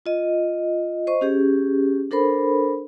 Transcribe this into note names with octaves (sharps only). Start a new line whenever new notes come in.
F4 D#5
C5 D#5 C#6
C#4 G4 G#4
D4 A4 A#4 C5 B5